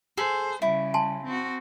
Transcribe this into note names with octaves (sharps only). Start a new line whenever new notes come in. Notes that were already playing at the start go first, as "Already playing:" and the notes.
G#4 A4 C5
C#3 G3 E4
G#5 A5 C6
C4 F#4